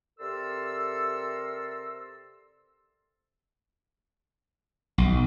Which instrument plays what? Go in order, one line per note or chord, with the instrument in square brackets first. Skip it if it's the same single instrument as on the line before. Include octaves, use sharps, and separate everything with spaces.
[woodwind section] C3 A4 A#4 D5 C6 E6
[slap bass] B1